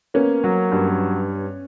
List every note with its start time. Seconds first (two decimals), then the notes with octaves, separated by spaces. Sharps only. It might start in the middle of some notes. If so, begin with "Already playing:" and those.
0.14 A#3 B3 C#4
0.44 F#3
0.72 G2